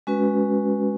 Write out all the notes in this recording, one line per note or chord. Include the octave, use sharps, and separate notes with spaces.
G#3 C#4 F#4 B4